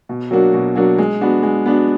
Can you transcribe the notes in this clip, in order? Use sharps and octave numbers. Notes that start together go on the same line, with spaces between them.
B2
F#3 A#3 D4 F#4
B2
F#3 A#3 D4 F#4
G#3
B3 D4 F#4
G#3
B3 D4 F#4